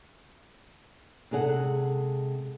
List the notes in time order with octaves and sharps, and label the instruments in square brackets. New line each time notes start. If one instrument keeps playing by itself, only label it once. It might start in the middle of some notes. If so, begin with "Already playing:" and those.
[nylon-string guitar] C3 G#3 G#4 A4 F5 F#5